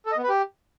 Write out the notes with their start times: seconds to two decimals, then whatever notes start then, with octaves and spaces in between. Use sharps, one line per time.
0.06 A4
0.12 D#5
0.17 B3
0.23 B4
0.29 G4